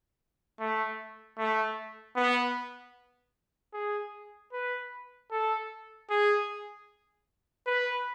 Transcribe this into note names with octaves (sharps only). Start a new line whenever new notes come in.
A3
A3
B3
G#4
B4
A4
G#4
B4